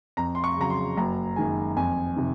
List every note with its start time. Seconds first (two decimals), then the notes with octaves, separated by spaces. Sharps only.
0.17 F2 A#5
0.35 C6
0.44 C#6
0.57 C#3 F#3 A#5
0.70 C6
0.97 F#1 A#5
1.36 F#2 D#3 G#3 G#5
1.76 F2 G#5
2.16 C3 D#3